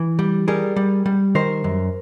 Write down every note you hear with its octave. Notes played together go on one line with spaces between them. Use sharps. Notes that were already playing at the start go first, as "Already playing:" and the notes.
Already playing: E3
G3
G3 G#4 A#4
G3
G3
D#3 A#4 C5
F#2